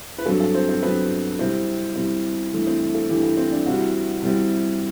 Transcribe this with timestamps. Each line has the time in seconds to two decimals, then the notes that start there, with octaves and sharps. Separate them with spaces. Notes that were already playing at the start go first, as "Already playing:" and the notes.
0.18 B4
0.26 G2 F#3 C4 A4
0.40 A4
0.54 C4 C5
0.69 C4 C5
0.83 G2 F#3 B3 C4 B4
1.39 C3 G3 C4 E4 C5
1.96 C3 G3 C4 E4
2.53 G2 E3 A3 E4
2.67 C4 C5
2.95 A4
3.09 G2 E3 A3 E4 G4
3.23 A4
3.37 C4 C5
3.52 D4 D5
3.66 C3 G3 C4 E4 F#4 F#5
4.22 C3 G3 C4 E4